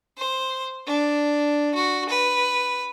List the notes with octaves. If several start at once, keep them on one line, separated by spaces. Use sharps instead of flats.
C5
D4
F#4
B4